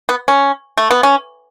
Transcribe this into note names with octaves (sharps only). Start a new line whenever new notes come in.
B3
C#4
A3
B3
C#4